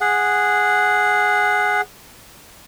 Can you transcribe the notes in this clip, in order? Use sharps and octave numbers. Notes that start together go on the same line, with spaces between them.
G#4 F#5